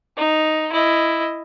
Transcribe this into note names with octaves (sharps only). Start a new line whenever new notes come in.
D#4
E4 D#5